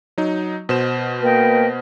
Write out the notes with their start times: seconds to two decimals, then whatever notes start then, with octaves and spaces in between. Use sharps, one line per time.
0.18 F#3 D#4
0.69 B2 C5 E7
1.22 A#3 B4 D#5 G5